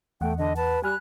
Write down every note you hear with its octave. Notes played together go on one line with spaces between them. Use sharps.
E2 A3 F#5 G5
D3 D#5
B4 A5
G3 G#5 B5 F6 F#6